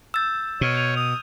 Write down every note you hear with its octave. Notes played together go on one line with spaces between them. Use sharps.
E6 G6 A6 E7
B2 C#5 F6 D#7
G6 G#6 F7
D#6 F7